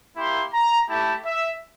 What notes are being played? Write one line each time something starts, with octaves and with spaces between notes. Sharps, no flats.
A#3 E4 G4 C6
A#5
A3 E4 G4 A5
E5